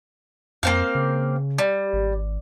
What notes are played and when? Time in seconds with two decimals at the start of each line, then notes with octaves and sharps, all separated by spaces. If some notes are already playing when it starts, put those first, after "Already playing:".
0.63 F2 A#3 C4 F5
0.95 C#3
1.58 G3
1.93 G#1